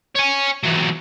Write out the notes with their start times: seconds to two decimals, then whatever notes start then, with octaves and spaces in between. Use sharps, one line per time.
0.16 C#5 G#5
0.63 E3 F#3